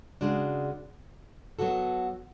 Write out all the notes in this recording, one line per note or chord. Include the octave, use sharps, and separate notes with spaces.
C#3 G#3 D4 F#4
F#3 B3 F#4 A4